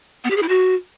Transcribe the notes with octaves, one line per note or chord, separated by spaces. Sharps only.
B3
G4
G#4
E4
F#4